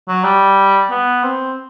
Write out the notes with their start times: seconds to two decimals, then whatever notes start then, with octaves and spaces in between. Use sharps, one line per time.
0.08 F#3
0.24 G3
0.91 B3
1.23 C4